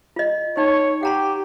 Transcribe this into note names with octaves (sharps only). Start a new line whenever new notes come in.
F4 D#5
D#4 C#5 G5
G4 F#5 A#5 C6